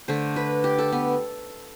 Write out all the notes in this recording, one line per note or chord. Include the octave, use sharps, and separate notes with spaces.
D3 A3 C5
B4
G4
A4
B3